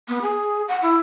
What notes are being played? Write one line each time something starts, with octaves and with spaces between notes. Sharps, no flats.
B3
G#4
F#5
E4